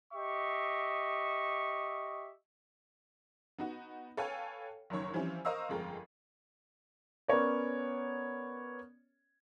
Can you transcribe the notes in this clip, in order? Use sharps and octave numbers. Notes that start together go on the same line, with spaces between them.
G4 D#5 E5 C#6
B3 D#4 F#4
A4 B4 C#5 F5 G5 G#5
F#1 F#2 D#3 C#5 C#6
E3 F3 G3 C4 C#4 E4
A#4 C5 D#5 F5 C#6 E6
G1 F2 G#3 A#4 G5
B3 C#4 A#4 C#5 D5